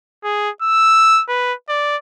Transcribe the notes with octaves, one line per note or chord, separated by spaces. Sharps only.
G#4
E6
B4
D5